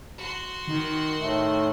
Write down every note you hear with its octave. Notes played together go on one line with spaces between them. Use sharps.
F#4 C6
D#3
A2 A3